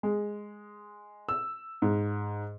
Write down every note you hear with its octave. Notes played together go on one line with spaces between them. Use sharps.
G#3
E6
G#2